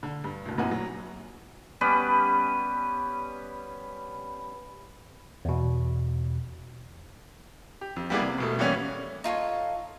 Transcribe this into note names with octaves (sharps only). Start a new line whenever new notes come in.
D3
G2
F#1 D2
A#1 F#2 E3 C4 F#5 G#5
F#3
G3 B3 C#4 B4
E2 B2
G4
F2
G3 A#3 B3 E4 G#4 D5
C3
E1 B2 A3
E3 G3 A#3 B3 C#4
D#4 F4 A4 C#5